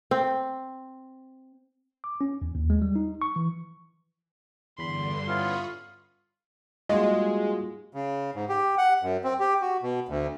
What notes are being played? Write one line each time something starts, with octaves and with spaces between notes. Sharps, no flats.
C4
D6
C#4
E2
D#2
G#3
G3
D#4
C#6
E3
E2 G2 D3 B5 C6
B3 C#4 E4 F4 B5 C#6 D#6
G3 G#3 A#3 D#4 F4 F#4 G#4 D#5
C#3
G#2
G4
F#5
F#2
C4
G4
F#4
B2
D2